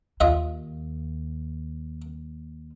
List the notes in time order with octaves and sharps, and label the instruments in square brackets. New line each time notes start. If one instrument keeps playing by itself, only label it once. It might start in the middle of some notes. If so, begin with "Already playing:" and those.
[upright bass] D#2 [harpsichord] F4 D#5 E5